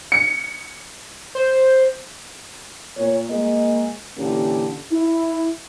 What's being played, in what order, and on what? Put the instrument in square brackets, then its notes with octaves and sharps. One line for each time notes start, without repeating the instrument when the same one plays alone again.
[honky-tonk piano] C#7
[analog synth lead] C5
[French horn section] A#2 C#5
G#3 A#3 D#5
A#2 D3 E3 A#3 C#4 G4
E4